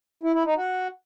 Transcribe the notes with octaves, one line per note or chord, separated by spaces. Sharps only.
E4
E4
D#4
F#4